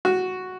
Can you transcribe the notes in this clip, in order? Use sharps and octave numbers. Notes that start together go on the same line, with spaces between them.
F#4